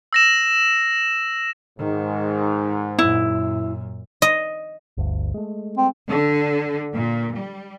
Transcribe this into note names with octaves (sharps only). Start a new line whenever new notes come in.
E6 A#6 E7
G#2 D#3
F#2 A#2 E4
D#5
G1 D2
G#3 A3
C4
D3
A#2
G3